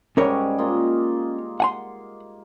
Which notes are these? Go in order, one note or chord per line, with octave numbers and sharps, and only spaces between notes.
G#2 G3 C#4 A#4 C#5
A#3 F4 D#5
F#5 G#5 C6